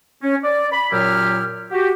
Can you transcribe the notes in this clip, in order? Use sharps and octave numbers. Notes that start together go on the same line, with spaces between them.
C#4
D5
B5
F#2 A#2 F#3 E4 G4 F6
F#4 G4